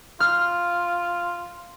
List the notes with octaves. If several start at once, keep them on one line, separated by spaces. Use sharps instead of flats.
F4 F6